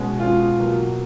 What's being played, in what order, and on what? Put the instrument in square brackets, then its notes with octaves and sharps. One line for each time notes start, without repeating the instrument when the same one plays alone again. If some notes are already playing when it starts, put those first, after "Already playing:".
Already playing: [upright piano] B2 G#3 C#4
[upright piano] B2 G#3 C#4 [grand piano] F4
[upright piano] B2 F#3 A#3